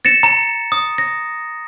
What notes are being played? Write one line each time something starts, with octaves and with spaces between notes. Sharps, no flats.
A6 A#6 C#7 E7
A#5
D#6
A#6